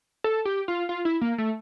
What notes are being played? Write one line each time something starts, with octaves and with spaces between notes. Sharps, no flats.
A4
G4
F4
F4
E4
A#3
A3